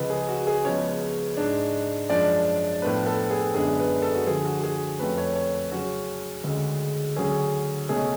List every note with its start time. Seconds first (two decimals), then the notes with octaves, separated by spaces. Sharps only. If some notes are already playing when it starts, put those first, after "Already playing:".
Already playing: C#2 C#3 F3 B4
0.10 G#4
0.29 F#4
0.47 G#4
0.65 C#2 C#3 F3 G#3 B3 C#5
1.37 G#2 G#3 D4
2.10 F#2 F3 G#3 D4 D5
2.82 A2 F3 B3 D4 B4
3.06 A4
3.31 G#4
3.55 F#2 D3 G#3 B3 D4 G#4
3.79 B4
4.02 A4
4.15 F#4
4.27 D2 D3 F3 G#4
4.45 F#4
4.63 G#4
4.99 F2 F3 A3 C#4 B4
5.18 C#5
5.35 C#5
5.72 C#3 F#3 C#4 F#4
6.44 D2 C#3 G#3
7.16 D2 C#3 F#3 C#4 G#4
7.89 C#2 B2 A3 C#4 G#4